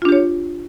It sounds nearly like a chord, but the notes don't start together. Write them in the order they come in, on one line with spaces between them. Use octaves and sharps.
F4 D4 G4 C#5